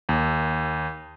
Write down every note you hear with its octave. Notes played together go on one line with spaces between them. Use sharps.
D#2